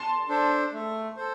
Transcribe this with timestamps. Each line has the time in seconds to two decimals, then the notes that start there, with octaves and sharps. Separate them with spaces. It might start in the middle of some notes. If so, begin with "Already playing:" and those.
Already playing: A5 C6
0.29 D4 A4 C5
0.73 A3
1.17 A4 C5